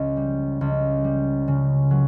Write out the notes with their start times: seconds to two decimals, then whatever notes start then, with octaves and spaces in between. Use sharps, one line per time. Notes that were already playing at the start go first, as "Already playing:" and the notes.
Already playing: C#2
0.17 G3
0.61 C#2
1.04 G3
1.48 C#3
1.91 F#3